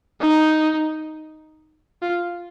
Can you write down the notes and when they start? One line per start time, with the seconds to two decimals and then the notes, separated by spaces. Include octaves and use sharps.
0.21 D#4
2.02 F4